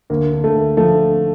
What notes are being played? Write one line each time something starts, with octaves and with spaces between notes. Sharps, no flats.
D2 A#3
D3
A3
D2
F3 A3